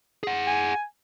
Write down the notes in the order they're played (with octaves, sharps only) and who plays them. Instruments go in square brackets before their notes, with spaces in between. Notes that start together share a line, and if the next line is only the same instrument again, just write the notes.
[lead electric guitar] G#4 F#5
[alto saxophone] G#5